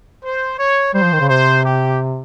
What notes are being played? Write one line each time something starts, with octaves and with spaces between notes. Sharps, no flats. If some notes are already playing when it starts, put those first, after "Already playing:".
C5
C#5
G3 C5
F3
D#3
C#3
C3 C5
G4